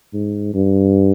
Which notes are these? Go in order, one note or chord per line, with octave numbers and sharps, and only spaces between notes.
G#2
G2